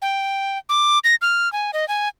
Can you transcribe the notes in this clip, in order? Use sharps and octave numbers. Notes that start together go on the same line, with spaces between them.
G5
D6
A#6
F6
G#5
D#5
G#5